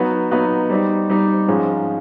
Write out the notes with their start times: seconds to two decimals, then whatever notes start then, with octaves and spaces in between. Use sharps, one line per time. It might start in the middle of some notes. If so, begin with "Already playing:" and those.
Already playing: F#3 B3 D#4 F#4 B4
0.31 F#3 B3 D#4 F#4 B4
0.70 G3 C4 D#4
1.10 G3 C4 D#4
1.48 G#2 F3 G#3 C#4